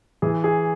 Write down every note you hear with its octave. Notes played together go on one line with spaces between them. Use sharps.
E3 G#4
G#4